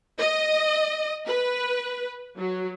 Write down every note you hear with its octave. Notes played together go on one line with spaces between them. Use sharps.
D#5
B4
F#3